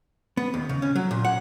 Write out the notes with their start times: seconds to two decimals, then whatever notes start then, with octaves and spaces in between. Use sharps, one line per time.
0.37 B3
0.54 D#2
0.69 C#3
0.82 C#4
0.96 F#3
1.11 A#2
1.25 F#5